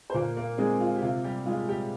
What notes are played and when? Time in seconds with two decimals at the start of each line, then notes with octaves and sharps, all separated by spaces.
0.10 C5
0.14 A#2 A#3 A#4
0.37 A#3 A#4
0.58 G#3 C4 G#4
0.80 F4
0.95 G4
1.02 C3 F4
1.24 G3 G4
1.46 G#3 F4
1.69 G3 G4